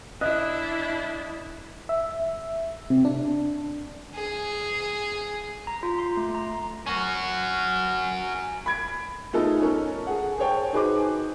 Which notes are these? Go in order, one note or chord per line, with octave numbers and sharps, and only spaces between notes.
D4 E4 D#5 F#6
E5
C3
D4
G#4
A#5
F4
C6
A3
A#5
C#4 F#4
B5 G#6 D7
A3 B3 D#4 F4 G#4 A4
C#4 A4 A#4
G#4 F#5
G#4 C5 C#5 G5 A5
D#4 F#4 G#4 B4 C5 D6